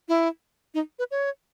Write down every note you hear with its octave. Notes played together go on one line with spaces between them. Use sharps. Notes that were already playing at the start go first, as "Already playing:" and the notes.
E4
D#4
B4
C#5